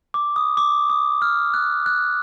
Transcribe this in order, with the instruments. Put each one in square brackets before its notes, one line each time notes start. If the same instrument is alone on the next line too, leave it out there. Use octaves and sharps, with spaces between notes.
[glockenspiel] D6
D#6
D6
D#6
F6
F#6
F#6